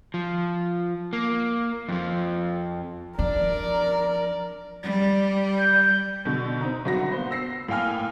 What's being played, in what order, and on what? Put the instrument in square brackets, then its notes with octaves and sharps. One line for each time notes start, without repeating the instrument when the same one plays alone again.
[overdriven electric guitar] F3
A#3
F2 F3
[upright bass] F3 [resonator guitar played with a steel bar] D4 [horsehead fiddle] A#4 [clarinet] D5
[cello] G3
[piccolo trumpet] G6
[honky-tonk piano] B2 D3
C4 D#4 A#5
G1 F#3 F#4 B5 A#6
A#3 B3 C5
E6 A#6 C7
A2 A#3 F5 G5 G#5 F6